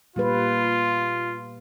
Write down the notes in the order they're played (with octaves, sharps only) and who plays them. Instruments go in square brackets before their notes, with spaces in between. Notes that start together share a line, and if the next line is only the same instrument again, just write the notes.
[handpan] A#2 G3 B4 [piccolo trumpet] F4